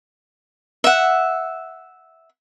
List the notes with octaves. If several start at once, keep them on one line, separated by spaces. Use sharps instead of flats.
E5 F#5